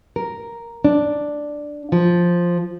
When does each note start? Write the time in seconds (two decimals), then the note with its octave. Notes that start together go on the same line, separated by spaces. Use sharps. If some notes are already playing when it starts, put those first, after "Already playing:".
0.16 A#4
0.84 D4
1.92 F3